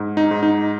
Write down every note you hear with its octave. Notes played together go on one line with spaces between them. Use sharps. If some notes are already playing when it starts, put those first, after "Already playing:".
Already playing: G#2
D#4
G#2
D#4